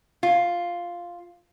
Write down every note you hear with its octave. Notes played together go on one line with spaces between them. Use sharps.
F4